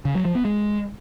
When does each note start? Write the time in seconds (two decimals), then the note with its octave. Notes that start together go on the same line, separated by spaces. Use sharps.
0.05 C#3
0.15 F#3
0.25 F3
0.35 B3
0.45 G#3